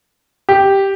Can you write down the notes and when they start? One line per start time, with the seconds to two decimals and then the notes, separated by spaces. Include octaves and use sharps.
0.49 G4